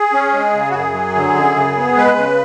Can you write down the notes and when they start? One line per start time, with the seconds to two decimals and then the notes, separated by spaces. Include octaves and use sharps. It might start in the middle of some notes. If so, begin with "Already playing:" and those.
Already playing: G#4
0.13 C#4
0.33 G#3
0.54 C#3
0.70 F#4
0.73 F#2 G#4
0.94 F#3
1.16 D3
1.35 F#2
1.56 C#3
1.77 B3
1.97 G#3 B4
2.17 C#3